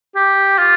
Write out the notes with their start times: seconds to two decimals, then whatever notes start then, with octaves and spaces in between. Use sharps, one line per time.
0.16 G4
0.58 F4